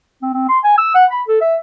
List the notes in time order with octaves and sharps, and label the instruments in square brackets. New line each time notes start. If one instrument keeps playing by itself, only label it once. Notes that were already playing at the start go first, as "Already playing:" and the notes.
[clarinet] C4
C4
C6
G#5
E6
F#5
B5
A4
E5